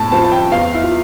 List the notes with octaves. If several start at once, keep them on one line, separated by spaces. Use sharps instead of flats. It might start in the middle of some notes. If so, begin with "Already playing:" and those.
Already playing: A2 A5
F3 C4 A5
A5
G5
E2 F5
E4
F4